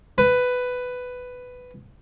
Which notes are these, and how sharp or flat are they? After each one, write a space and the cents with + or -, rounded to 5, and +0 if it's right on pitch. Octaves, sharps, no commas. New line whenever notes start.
B4 +10